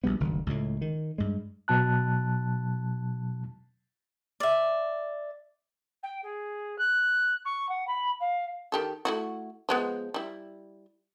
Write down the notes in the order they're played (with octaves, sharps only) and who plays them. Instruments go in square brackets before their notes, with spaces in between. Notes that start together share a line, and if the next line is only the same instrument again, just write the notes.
[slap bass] A#1 G3 B3
F#1 D2 G2 D#3
C#2 A2
D#3
G2 G#3
[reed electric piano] B2 F#3 A5 F#6
[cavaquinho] D5 E5
[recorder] G5
G#4
F#6
C#6
F#5
B5
F5
[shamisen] D#3 G4 A4
A3 E4 F#4
F3 G#3 B3
G3 E4